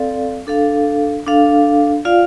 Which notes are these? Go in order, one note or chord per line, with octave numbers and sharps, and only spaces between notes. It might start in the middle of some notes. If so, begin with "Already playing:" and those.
Already playing: C4 A4 D5 F5
D4 A4 F5
D4 A4 F5
F4 D5 F5